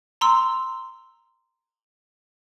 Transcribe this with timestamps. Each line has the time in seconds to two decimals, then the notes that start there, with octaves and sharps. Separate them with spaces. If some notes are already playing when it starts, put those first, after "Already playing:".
0.21 A#5 C6 E6